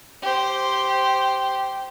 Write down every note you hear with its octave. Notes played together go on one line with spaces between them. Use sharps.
G4 C5